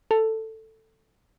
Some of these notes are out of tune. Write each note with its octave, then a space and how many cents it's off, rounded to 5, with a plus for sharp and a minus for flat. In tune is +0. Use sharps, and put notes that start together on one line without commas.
A4 +10